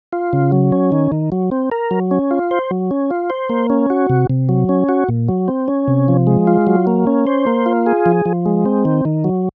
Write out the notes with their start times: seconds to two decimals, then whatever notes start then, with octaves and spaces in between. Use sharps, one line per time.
0.13 F4
0.33 C#3
0.52 F#3
0.72 C#4
0.92 D#3
1.12 D#3
1.32 F#3
1.51 C4
1.72 A#4
1.91 F#3
2.11 C#4
2.31 F4
2.51 C5
2.71 F#3
2.91 C#4
3.10 F4
3.30 C5
3.49 A#3
3.70 C#4
3.90 F#4
4.10 C3
4.30 C3
4.49 F#3
4.69 C#4
4.89 F#4
5.09 A#2
5.28 F#3
5.48 C4
5.68 C#4
5.88 C3
6.08 F3
6.27 G#3
6.47 F4
6.67 F#3
6.87 A#3
7.07 C#4
7.27 C5
7.47 A#3
7.66 F4
7.86 G#4
8.06 F3
8.26 F3
8.46 G#3
8.66 C4
8.85 D#3
9.05 D#3
9.24 F#3